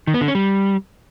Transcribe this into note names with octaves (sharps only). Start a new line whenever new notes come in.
D#3
B3
D3
C#4
G3